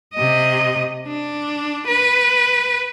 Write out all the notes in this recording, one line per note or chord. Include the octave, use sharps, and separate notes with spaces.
C3 D#5
D4
B4